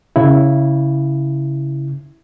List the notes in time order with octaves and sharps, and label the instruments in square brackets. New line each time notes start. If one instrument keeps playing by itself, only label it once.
[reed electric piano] C#3 E4